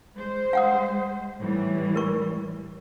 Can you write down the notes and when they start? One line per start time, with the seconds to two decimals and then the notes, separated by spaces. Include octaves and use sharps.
0.16 G#3 C5
0.53 F5 F#5 D#6
1.39 A2 E3 G3
1.96 A#4 C#6